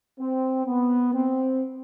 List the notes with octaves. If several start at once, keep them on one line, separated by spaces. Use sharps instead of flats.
C4
B3
C4